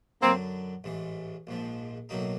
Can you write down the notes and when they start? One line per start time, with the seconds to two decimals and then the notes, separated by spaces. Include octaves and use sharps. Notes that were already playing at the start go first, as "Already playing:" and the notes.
0.22 F#2 D3 F#3 A#3 C4
0.84 A1 G#2 E3
1.47 A#1 G#2 F3
2.09 B1 A2 F#3 A#3 D#4